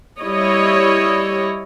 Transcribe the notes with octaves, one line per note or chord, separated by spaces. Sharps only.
G3 E4 C#5 D#5